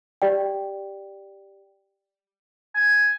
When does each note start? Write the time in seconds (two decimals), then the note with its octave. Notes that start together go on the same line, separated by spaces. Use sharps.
0.22 G4 D5 G5
2.75 G#5